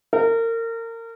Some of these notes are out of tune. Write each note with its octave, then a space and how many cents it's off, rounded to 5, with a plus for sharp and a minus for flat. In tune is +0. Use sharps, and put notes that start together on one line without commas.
A#4 -30